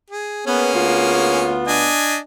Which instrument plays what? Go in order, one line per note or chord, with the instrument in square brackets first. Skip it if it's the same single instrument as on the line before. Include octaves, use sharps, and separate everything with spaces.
[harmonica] G#4
[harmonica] A#3 C#4 G#4 [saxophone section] B3
[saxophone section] D2 B3 F4
[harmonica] D4 D#5 G#5